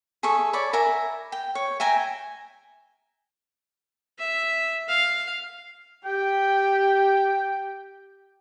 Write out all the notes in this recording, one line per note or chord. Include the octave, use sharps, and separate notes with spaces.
G#4 A4 E5 C#6
C#5 D5 B5
A#4 E5 G#5 B5
G5
C#5
E5 G5 G#5 A#5
E5
F5
G4 G5